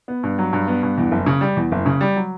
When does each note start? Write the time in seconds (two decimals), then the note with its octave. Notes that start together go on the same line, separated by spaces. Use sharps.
0.08 B3
0.23 G2
0.38 F#3
0.53 G2
0.68 B3
0.83 G2
0.98 E2
1.11 F#1
1.26 C#3
1.41 G3
1.57 E2
1.72 F#1
1.86 C#3
2.01 G3
2.16 F#3